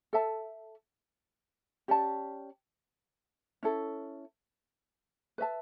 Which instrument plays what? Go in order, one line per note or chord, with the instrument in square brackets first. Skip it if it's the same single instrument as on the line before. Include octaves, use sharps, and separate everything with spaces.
[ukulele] A4 E5 A5
C#4 G4 D5 A5
C#4 E4 A4
B4 E5 A5